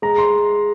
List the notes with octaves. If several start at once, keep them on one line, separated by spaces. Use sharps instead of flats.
G#3 A#5
C6